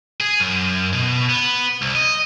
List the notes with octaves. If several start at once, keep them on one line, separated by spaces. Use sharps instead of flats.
G#4
F#2
B2
B3
C2
D#5